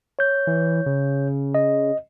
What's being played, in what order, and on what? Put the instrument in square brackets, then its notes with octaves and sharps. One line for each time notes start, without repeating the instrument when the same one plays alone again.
[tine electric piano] C#5 G6
[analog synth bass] E3
C#3
[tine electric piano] D#5